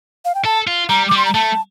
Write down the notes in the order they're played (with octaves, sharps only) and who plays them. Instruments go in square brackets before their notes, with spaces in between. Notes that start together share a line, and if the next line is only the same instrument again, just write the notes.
[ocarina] F5
G5
[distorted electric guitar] A4 [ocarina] A5
[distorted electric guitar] F4
[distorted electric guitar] G3 [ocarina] A#5
[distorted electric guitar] G3 [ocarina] D6
[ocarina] C6
A#5
[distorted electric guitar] A3 [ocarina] A5